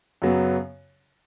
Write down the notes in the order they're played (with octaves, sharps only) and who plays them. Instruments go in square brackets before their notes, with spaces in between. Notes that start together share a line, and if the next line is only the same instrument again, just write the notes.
[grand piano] F#2 C#3 F#3 B3